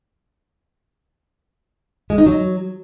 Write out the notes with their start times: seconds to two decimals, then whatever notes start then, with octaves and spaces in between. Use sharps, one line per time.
2.10 G#3
2.18 D#4
2.26 F#3